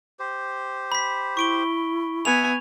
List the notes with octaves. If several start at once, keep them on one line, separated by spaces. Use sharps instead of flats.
G4 C5
B5 B6
E4 C#6 D7 G7
B3 E5 G#5 F7